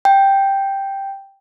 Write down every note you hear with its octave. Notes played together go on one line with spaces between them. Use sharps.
G5